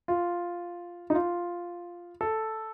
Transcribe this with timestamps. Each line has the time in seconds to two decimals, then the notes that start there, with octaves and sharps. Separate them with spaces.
0.08 F4
1.10 D#4
1.15 F4
2.21 A4